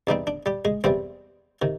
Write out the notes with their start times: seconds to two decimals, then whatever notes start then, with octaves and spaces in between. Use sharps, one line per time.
0.07 E2 C3 E3 G3 C4 D#4
0.27 D4
0.46 G3 G4
0.65 G#3 G#4
0.84 E2 C3 E3 G3 C4 C5
1.62 C3 D#3